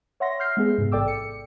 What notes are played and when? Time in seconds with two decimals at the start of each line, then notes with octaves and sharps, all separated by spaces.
0.20 C#5 E5 F#5 C6 A#6
0.40 F6 G6 C7
0.57 G#3 B3 G#4 E5
0.78 G#2 C3
0.92 A1 A4 D5 G5 D6 E6
1.08 C#7